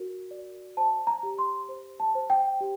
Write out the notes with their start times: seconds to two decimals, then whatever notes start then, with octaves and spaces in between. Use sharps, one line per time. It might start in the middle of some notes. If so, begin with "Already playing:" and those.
Already playing: F#4 A#4
0.31 D5
0.77 C5 A5
1.07 A#5
1.23 G4
1.38 C6
1.69 C5
2.00 A5
2.15 C5
2.30 G5
2.61 G4